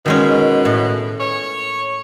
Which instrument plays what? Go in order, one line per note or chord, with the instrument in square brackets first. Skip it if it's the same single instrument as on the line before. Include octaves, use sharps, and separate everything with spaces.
[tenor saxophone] B2 [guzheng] D#3 G#3 C#4
[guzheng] A2
[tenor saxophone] C#5